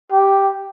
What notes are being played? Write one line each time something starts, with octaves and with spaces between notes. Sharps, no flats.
G4